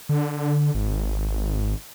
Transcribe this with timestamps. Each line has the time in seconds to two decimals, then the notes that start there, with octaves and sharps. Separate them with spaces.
0.09 D3
0.75 G#1